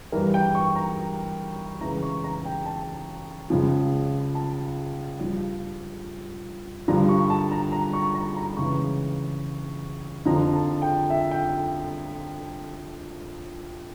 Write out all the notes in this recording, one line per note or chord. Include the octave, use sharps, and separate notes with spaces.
G2 E3 A#4
G5
C#6
A#5
C#2 C#3 E3 A#5
C#6
A#5
G5
A5
C#2 C#3 F3
A5
G2 F3
G2 D3 F3 A#5
C#6
A5
A#5
A#5
C#6
A#5
A#5
C#2 C#3 E3 C#6
F2 D3 F3 A#5
A5
G5
E5
G5